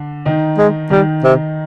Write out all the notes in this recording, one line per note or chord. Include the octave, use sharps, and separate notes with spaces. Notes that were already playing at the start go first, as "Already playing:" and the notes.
Already playing: D3 D4
D#3 D#4
G#3
D#3 G3 D#4
C3